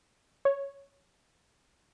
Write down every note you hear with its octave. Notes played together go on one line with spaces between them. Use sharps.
C#5